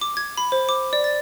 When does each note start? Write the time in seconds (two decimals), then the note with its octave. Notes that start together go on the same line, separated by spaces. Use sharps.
0.02 D6
0.17 G#6
0.37 B5
0.52 C5
0.69 D6
0.93 D5
1.04 A6